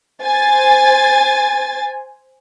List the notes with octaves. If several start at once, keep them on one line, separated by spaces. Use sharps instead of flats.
C5 G#5 A6